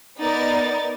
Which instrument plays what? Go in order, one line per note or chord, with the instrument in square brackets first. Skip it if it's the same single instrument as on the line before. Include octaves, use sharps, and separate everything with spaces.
[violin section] B3 D#4 A#4 D5 A6